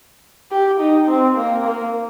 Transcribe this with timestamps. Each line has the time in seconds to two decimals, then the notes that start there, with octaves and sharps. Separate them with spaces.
0.51 G4
0.80 D#4
1.08 C4
1.36 A#3
1.65 A#3